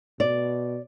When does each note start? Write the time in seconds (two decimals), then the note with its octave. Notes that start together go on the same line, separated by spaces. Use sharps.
0.20 B2 D5